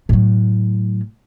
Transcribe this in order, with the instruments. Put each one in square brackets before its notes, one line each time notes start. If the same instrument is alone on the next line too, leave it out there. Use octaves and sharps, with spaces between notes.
[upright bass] A2 F#3